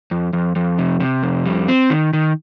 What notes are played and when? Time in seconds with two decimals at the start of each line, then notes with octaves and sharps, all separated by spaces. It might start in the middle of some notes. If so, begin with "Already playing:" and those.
0.11 F2
0.33 F2
0.56 F2
0.79 C3
1.00 C3
1.23 F2
1.45 G3
1.68 C4
1.90 D#3
2.13 D#3